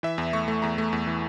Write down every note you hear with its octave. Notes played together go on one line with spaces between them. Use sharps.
E3 E5
E2
A3 C#6
A3
E2 A#5
A3
E2
E3